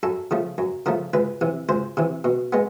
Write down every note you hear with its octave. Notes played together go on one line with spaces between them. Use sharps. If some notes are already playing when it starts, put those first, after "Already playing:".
F#2 A4
C#3 F3 A3
F#2
C#3 F3 A3 A#4
C#2 B4
C3 E3
C#2 C5
C3 E3
B2
G#3 B3